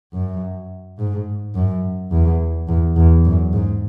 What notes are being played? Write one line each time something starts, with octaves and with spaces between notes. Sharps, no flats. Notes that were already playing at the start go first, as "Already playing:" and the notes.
F#2
G#2
F#2
E2
E2
E2
F#2
G#2